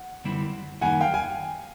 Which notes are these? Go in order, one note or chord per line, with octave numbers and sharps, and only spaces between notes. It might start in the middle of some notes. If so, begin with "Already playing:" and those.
Already playing: F#5
F#2 D3 G3 C4 E4
F#2 D#3 G3 A#3 F#5 G#5
F5 G5
G#5